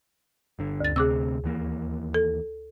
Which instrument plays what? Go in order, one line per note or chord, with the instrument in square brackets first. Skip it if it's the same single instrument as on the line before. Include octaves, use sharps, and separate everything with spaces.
[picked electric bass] G1 D3
[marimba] D2 A6
[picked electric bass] D2 C3 C4 [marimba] G#4 D6 E6
[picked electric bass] D#2 E3 A#3
[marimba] A4